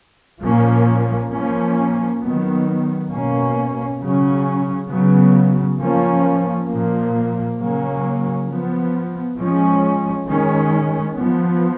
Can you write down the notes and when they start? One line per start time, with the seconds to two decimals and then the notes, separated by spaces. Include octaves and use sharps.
0.42 A#2 F3 A#3 C#4
1.32 F3 A#3 C#4
2.22 D#3 F#3 B3
3.11 B2 A#3 C#4
4.01 C#3 F#3 C#4
4.90 C#3 F#3 B3
5.79 F3 A#3 C#4
6.69 A#2 F3 A#3
7.59 C#3 F#3 A#3 C#4
8.49 F3 B3
9.38 F3 G#3 C#4
10.28 D#3 G#3 C#4
11.17 F3 B3